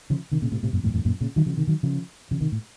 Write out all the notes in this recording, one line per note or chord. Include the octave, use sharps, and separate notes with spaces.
C#3 F3
C3 D#3
A#2 C#3
A2 C3
A2 C3
F#2 A#2
F2 A2
F2 A2
F#2 A#2
A#2 C#3
D#3 F#3
C#3 F3
C3 D#3
D#3 F#3
C#3 F3
C#3 F3
C3 D#3
A2